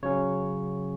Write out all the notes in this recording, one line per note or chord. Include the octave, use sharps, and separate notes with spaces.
C#3 F#3 C#4 C#5